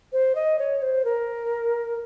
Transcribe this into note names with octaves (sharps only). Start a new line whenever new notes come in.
C5
D#5
C#5
C5
A#4